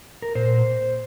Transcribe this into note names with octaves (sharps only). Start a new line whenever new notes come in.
A#4
A#2 C5